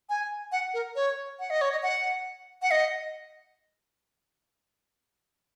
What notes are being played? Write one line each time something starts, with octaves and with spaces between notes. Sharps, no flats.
G#5
F#5
A#4
C#5
F#5
D#5
C#5
D#5
F#5
F#5
D#5